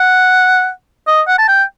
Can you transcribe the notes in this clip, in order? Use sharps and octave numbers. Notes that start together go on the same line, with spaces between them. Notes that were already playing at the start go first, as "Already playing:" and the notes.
Already playing: F#5
D#5
F#5
A5
G5